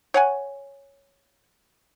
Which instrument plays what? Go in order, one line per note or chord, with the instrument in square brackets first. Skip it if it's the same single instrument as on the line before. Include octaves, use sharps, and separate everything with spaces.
[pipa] C#5 F#5 G#5